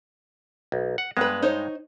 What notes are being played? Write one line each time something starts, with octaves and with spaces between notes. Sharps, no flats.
B1
F#5
G2 G#3 B3 B4
D#4 C5 C#5